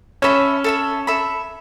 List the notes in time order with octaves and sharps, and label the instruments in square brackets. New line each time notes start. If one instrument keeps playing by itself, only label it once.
[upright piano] C#4 [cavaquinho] A4 E5 B5
[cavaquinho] A4 E5 B5
A4 E5 B5